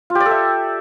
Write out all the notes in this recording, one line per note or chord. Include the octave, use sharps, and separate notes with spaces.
F4
G4
D5
A4
E5